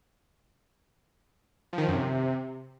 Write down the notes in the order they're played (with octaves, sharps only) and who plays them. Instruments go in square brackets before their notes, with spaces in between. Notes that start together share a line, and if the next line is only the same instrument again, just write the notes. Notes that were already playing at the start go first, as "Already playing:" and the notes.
[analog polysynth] F3
D#3
F3
F#2
C3